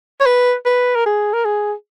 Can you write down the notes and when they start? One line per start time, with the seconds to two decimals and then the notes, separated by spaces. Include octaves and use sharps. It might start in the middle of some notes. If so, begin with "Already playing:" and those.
0.20 C#5
0.26 B4
0.65 B4
0.95 A#4
1.05 G#4
1.33 A#4
1.45 G#4